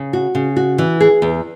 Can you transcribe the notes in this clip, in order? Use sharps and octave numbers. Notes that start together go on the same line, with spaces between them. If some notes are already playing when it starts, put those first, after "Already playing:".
Already playing: C#3
F#4
C#3
F#4
E3
G#4
E2